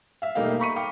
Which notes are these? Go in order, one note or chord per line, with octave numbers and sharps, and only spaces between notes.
E5 F5
E1 G3 A3 A#3 D#4 F5
A#5 B5 C#6 B6 C#7 D#7
F5 G5 D6 C#7